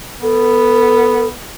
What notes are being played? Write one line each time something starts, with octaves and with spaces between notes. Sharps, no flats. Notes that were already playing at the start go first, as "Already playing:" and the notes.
B3 A4